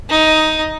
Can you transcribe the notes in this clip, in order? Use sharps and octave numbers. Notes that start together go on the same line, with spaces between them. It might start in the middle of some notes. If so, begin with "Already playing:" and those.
D#4